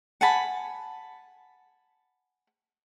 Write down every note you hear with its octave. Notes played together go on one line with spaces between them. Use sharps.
F#5 G#5 A5 B5